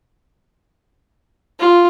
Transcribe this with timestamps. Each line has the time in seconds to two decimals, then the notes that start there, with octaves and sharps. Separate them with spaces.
1.59 F4